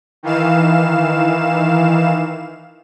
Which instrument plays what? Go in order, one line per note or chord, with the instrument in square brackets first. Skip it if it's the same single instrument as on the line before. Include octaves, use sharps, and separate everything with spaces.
[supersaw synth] D#3 E3 F5 E7